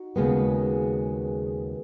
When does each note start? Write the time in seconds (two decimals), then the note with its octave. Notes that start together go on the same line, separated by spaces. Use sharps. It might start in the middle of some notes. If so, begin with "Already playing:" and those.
Already playing: D#4 F#4
0.16 D#2 C#3 G#3 B3